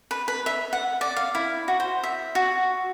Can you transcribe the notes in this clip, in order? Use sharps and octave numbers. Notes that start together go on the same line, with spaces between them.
B4
B4
E5
F#5
D5
F5
E4
F#4
C5
E5
F#4